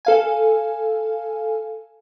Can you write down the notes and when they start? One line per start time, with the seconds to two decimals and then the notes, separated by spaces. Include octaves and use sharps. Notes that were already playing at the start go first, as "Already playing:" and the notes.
0.05 A4 F5 G#5